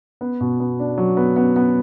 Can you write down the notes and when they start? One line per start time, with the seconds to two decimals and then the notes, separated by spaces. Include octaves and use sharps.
0.21 B3
0.40 B2
0.60 B3
0.79 D4
0.98 F#3
1.17 B3
1.36 B3
1.56 B3